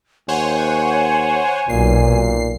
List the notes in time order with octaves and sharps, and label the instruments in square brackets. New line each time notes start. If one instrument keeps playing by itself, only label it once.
[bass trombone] D#2 [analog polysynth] C5 C#5 F#5 [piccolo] G#5
[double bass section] B1 [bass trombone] A#2 [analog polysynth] C7